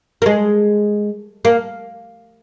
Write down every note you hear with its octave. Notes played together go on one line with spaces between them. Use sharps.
A#3
G#3
A#3